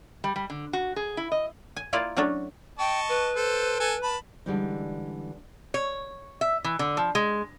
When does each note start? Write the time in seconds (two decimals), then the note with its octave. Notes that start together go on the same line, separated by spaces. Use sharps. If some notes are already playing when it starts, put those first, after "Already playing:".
0.24 G3
0.36 G3
0.50 D3
0.73 F#4
0.96 G#4
1.17 E4
1.32 D#5
1.76 G#5
1.93 A#3 E4 F4 D5 F5
2.17 F#3 A3 C#4 D4 A4
2.79 D#5 G5 A5 C#6
3.09 B4
3.36 A4 C5
3.80 A4 G#5
4.03 A5 B5
4.46 D3 E3 G3 G#3 D#4
5.74 C#5
6.41 E5
6.64 E3
6.79 D3
6.97 F3
7.15 G#3